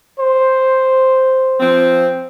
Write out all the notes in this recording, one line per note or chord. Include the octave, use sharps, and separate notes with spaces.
C5
F3 C4